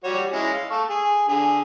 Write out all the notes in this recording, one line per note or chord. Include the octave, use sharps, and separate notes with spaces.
G3 F#4 C#5
G#3 C#4 E4
F5
A4 C#6
G#4
D3 G#4